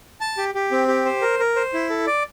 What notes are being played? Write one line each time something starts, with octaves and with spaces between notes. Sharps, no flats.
A5
G4
G4
C4
G4
C5
A#4
A#4
C5
E4
A4
D5